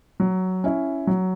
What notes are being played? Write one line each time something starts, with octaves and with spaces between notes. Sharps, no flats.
F#3
C#4 E4
F#3